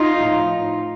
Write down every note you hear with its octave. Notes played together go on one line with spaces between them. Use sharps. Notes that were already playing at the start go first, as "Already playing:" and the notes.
Already playing: D#4 F4
A2 F3